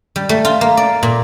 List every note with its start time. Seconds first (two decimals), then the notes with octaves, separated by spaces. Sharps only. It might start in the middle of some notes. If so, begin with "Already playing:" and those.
0.16 G3
0.29 A3
0.45 F4
0.61 A#3
0.77 D5
1.03 A#2